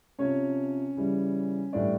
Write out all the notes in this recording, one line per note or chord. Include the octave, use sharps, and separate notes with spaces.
C3 F3 C#4 C#5
C#3 E3 G3
A2 E3 G3 D4 D5